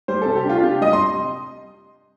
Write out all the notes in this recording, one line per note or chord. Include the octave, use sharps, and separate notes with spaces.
G3 C5
C3 A4
G4
D4 F4
F4
C3 G4
G3 D#5
C6